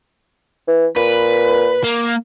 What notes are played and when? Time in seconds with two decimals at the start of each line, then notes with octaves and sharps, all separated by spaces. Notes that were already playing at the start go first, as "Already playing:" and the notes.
0.68 E3
0.96 A#2 B4
1.84 A#3